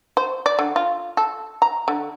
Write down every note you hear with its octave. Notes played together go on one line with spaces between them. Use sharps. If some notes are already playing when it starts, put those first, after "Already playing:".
C5
D5
D3
F4
A4
A#5
D3